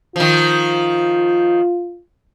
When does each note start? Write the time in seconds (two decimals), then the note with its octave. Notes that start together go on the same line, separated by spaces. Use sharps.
0.16 D#3 F3 F4